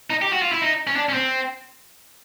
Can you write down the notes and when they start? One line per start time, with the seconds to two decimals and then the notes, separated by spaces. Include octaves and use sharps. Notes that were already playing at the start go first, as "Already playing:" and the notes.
0.10 D#4
0.22 G4
0.32 F#4
0.42 F4
0.52 E4
0.61 D#4
0.87 C#4
0.96 D4
1.09 C#4
1.13 C4